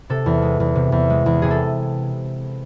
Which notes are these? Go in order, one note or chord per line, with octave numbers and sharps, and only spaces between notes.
C3 A4
E2
G#3
E2
C3
E2
G#3
E2
C3 G#4
A4